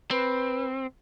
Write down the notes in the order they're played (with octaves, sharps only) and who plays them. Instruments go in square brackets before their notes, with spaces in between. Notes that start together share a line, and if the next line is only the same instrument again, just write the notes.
[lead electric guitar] C4 [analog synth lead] B4